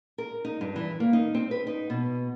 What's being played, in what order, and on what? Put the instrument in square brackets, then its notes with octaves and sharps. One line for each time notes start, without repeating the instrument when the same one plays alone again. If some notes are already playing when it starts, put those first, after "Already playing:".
[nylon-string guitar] A#4
D#4
G2
E3
A#3
D#4
C4
B4
D#4
B2